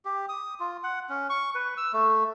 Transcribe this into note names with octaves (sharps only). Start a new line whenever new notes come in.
G4
D#6
F4
F#5
C#4
C#6
B4
E6
A3